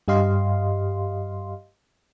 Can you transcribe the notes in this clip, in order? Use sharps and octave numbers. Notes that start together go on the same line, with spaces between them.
G2 G4 D#5 F5 C6